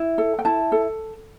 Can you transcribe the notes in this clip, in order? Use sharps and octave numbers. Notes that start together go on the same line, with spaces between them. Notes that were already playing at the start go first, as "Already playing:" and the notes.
Already playing: E4
A4
G5
E4 A5
A4